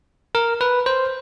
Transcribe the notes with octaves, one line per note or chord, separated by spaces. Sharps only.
A#4
B4
C5